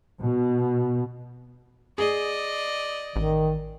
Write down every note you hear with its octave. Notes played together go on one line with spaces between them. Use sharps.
B2
G#4 D5 D#5
A1 D#3